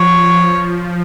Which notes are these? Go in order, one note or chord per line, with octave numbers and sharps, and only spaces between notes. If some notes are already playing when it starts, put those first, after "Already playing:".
Already playing: F3 C#5